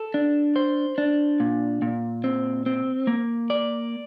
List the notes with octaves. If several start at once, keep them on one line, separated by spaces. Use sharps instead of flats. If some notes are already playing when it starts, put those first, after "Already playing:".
Already playing: A4
D4
C5
D4
A#2
A#2
C4
C4
A#3
D5